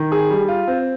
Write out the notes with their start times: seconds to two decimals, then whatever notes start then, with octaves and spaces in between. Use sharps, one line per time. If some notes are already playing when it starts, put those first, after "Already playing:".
Already playing: D#3
0.12 G#4
0.30 G3
0.48 F4
0.67 C4